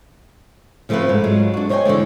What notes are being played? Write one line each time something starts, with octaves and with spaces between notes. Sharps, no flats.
C#3 F3 A3 C4 F4 B4
G#2
F#3 G#3 F4 G#4
D4 F#4
C5 C#5 D#5 F5 G5 G#5
D3 E3 G#3 A3